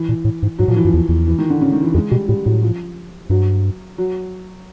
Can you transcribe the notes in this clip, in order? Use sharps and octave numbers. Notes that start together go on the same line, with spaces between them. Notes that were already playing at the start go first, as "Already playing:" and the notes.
Already playing: E3
A#2
A2
G#2
G#2 F#3
A#2 F3
A2 E3
G2 F3
E2
E2
E3
D#3
D3
C#3
D#3
E3
F2 G#3
B2 G3
A2 G3
A2 F#3
F3
G2 F#3
F#3